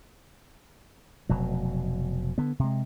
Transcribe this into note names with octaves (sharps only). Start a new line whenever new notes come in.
F1 B2 F#3
D3 B3
C3 G#3